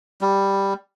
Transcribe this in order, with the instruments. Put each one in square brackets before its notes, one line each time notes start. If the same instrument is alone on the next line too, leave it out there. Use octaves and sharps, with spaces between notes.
[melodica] G3